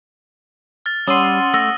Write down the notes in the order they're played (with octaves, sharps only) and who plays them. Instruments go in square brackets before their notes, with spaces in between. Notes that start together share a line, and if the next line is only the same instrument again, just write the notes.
[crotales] F6 A6
[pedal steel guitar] G3 [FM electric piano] C#4 C6 [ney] F#5 [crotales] D#6 E6 D#7
[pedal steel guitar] A3 E6 [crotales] A#6